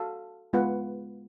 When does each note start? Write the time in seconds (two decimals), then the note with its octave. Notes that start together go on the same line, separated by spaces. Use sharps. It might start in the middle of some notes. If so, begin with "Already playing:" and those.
Already playing: F#4 A4 F5
0.53 G#3 B3 F4 B4 F#5